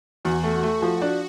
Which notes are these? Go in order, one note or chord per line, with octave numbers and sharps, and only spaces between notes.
E2 F#4
A3
A3
F3
D4